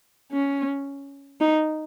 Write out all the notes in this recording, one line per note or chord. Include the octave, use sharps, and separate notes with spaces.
C#4
D#4